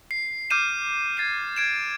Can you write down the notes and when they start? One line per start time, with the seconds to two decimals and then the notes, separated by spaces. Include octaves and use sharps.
0.11 C7
0.50 D6 F6 G6 C7 D#7 E7
1.17 G#6 A6 C7 D#7
1.56 G#6 D7 E7